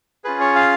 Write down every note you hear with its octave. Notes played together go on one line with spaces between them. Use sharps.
C#4 F4 G#4 B4
C#5
F5